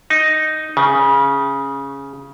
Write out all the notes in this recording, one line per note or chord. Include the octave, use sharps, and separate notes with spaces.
D#4
C#3